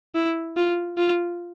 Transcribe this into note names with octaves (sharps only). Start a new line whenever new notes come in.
E4
F4
F4